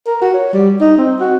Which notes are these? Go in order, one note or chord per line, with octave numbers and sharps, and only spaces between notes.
A#4
F#4
C#5
G3
D#4
C4
F#4